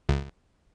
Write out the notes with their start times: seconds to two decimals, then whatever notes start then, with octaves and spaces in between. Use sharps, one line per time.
0.09 C#2